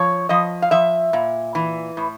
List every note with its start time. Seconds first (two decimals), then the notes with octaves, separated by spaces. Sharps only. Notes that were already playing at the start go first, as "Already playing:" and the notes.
Already playing: F3 C#5
0.29 F3 D#5
0.62 F5
0.71 F3 E5
1.13 A#2
1.55 E3
1.97 A2